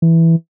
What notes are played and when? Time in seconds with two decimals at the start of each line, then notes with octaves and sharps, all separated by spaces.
0.02 E3